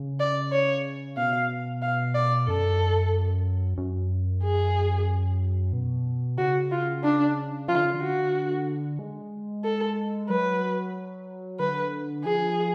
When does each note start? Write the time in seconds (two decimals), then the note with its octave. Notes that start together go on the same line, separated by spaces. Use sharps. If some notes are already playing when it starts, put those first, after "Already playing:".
Already playing: C#3
0.20 D5
0.52 C#5
1.17 B2 F5
1.82 F5
2.15 D5
2.48 F#2 A4
3.78 F#2
4.43 G#4
5.73 B2
6.38 C#3 F#4
6.72 F4
7.04 D4
7.68 F3 F4
7.77 D3
7.85 C#3
7.93 D3
8.02 F#4
8.99 G#3
9.64 A4
10.30 F#3 B4
11.60 D3 B4
12.25 F3 G#4